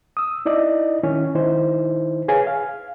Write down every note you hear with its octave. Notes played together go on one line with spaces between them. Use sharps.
D#6 E6
D#4 E4 D5 D#5
D#3 C#4 E4
D#3 D#4 E4 C5
G#4 B4 C#5 F5 G#5
F5